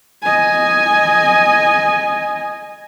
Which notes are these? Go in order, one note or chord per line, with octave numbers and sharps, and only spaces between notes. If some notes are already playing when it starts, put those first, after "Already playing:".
D#5 G#5